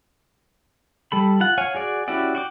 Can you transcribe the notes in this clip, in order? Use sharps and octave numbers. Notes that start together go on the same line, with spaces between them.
G3 A4 B5
F4 F#5
C#5 F5 F#5 G#5
F#4 G#4 D5
C#4 E4 F#4 G4 D5
F#4 G5 D6